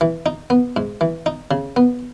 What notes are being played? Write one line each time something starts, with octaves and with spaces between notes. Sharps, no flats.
E3
D#4
B3
G#2
E3
D#4
C#3
B3